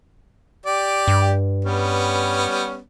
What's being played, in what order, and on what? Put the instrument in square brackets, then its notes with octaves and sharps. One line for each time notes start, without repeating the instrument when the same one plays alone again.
[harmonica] G4 D5
[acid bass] G2
[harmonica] G3 B3 C#4